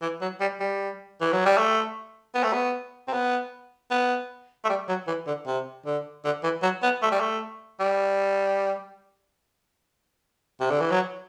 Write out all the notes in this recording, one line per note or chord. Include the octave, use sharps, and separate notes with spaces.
E3
F#3
G3
G3
E3
F#3
G3
A3
B3
A3
B3
C4
B3
B3
A3
G3
F#3
E3
D3
C3
D3
D3
E3
F#3
B3
A3
G3
A3
G3
C3
D3
E3
F#3